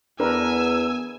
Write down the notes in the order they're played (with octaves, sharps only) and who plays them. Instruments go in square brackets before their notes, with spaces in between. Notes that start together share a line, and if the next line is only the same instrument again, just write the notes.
[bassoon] E2 [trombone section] B3 [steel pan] D4 A#4 B4 [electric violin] G#5 E6